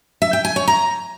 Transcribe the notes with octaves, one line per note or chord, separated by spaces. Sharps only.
E5
G5
G#5
C#5
A#5